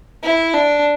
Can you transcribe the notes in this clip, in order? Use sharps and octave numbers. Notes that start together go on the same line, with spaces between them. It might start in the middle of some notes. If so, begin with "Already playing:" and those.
E4
D4